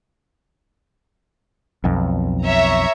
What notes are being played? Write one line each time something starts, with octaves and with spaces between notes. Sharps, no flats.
B1 F2
C#5 E5 A#5